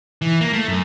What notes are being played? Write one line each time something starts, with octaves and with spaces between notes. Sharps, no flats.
E3
A#3
A3
F#2